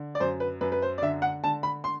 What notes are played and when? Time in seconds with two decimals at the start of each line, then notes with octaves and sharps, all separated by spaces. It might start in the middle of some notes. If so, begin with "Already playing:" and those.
Already playing: D3
0.15 D5
0.20 F#2 C5
0.40 B4
0.61 F#2 B4
0.72 B4
0.82 C5
0.98 D5
1.02 D3 E5
1.22 F#5
1.44 D3 A5
1.63 B5
1.84 C6